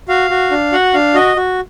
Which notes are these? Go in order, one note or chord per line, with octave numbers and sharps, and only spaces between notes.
F#4 F5
F#4
D4
F#4 F#5
D4 F5
F#4 D#5
F#4